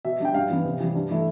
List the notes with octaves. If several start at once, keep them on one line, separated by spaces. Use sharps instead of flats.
B2 E5
G3 D4 G5
G2 F5
E3 B3
C3
E3 G3
G2
E3 A3 E4